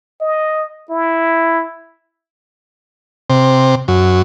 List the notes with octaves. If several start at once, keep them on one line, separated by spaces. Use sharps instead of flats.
D#5
E4
C3
F#2